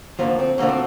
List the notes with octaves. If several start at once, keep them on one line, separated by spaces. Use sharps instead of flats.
D2 D3 F3 A#3
C4
D2 D3 F3 A#3
C4